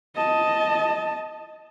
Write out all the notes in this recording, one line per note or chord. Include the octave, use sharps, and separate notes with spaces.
D#5 A5